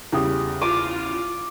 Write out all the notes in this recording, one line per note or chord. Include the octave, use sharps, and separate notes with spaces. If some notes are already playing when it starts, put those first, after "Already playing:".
E2 C#3 G3 G#4 G5 D#6
F4 D6 D#7